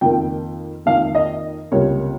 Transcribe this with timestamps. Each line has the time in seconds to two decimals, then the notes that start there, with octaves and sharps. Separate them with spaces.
0.01 F2 D#3 A#3 G5
0.86 F2 D#3 A#3 F5
1.15 D#5
1.71 C#2 C3 G3 A#3 C#5